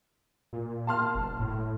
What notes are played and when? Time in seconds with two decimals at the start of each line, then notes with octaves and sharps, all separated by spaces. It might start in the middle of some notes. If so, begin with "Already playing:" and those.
0.53 A#2
0.87 A5 C6 F6
1.15 F#1
1.40 A2